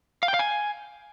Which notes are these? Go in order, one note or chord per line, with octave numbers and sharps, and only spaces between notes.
F5
G5
F5
G#5